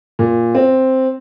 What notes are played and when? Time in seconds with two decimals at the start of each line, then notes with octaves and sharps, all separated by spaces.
0.19 A#2
0.55 C4